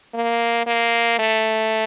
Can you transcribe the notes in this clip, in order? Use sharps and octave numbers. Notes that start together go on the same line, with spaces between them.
A#3
A#3
A3